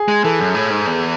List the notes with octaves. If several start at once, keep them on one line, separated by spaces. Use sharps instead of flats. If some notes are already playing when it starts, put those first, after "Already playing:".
Already playing: G#4
G#3
E3 A4
F#2
A2
G#2
E2